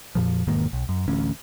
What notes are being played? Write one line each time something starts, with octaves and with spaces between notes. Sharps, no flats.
F2 A#2 F3
E1 G#2 D#3 A#3
B1
F#2
A1 D2 C#4